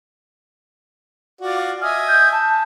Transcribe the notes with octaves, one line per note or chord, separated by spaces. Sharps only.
F4 F#4 D5
D#5 E5 G#5 F6
G6
A5